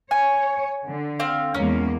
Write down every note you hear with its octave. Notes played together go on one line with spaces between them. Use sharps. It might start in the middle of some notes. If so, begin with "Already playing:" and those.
C#5 G#5
D3
C4 F5
E2 G#3 A#3 C#4